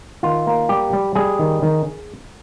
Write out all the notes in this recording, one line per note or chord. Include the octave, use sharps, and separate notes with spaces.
D#3 F4
A#3
G3 G4
G3
G3 G#4
D#3
D#3